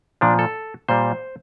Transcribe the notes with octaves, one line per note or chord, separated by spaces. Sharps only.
A#2 F3 D4
A4
A#2 G3 C5